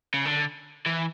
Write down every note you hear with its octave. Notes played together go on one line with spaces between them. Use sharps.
C#3
D3
E3